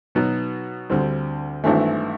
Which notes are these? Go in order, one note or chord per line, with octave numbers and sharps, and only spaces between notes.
B2 F#3 B3 D#4
D2 D3 G3 C4
G#1 G2 E3 A3